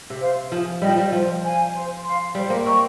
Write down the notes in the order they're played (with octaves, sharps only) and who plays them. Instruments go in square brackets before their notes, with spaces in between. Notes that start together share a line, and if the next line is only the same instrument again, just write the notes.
[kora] C3
[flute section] C5 F5
[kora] F3 [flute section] G#4
[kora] G3 [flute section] D#5 G5
[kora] F3
G3
[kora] F3 [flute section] C5
[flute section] F5 G#5
C5
F5 C6
[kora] G3 [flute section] C5
[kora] A#3
[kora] C4 [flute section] D#5 A#5 C#6